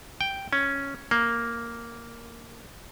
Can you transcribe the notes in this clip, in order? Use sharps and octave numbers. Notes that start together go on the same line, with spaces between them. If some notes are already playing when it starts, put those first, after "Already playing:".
G5
C#4
A#3